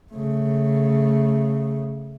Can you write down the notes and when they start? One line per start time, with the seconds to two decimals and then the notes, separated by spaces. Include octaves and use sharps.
0.12 C#3 A3